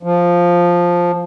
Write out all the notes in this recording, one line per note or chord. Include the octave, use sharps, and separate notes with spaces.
F3